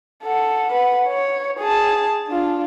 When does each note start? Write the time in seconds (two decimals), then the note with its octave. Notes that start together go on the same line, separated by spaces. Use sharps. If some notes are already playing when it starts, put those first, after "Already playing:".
0.23 A4 F#5
0.73 B4 F#5
1.09 C#5
1.59 G#4 A5
2.29 D4 F4